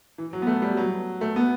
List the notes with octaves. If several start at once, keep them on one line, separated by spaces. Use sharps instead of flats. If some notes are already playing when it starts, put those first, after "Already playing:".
E3
F#3
B3
A3
G3
F#3
A3
B3